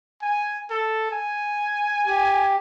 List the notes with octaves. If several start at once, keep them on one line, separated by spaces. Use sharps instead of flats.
G#5
A4
G#5
G4